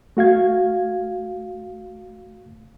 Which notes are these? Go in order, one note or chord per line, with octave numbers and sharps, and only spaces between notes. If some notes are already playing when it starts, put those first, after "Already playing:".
A3 F#4 F5 G#6